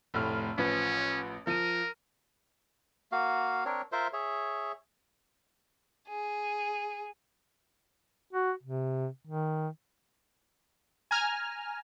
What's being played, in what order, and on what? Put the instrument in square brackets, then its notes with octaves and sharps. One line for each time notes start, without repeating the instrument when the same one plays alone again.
[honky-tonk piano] F1 A2 F6
[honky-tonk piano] A1 F3 B4 [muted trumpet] C#4
[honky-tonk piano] F3 D#7 [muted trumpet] A#4
[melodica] A#3 F#4 F5
C4 D4 A#4 C#5
F4 A#4 C5 E5
G#4 C#5 E5
[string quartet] G#4
[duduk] F#4
C3
D#3
[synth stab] G#5 A#5 F6